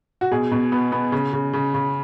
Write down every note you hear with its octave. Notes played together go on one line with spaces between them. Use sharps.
F#4
B2 G#4
B2
B3
B3
C#3
C#3
C#3
C#3